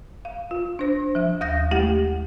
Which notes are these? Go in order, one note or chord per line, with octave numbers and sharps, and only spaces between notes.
F5
F4
D4 C5
F3 E5
D#2 F5 D#6 G6 A#6
G#3 A3 E4 G4 F#5